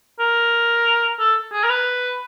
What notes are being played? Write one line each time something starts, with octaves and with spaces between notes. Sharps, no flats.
A#4
A4
G#4
A#4
B4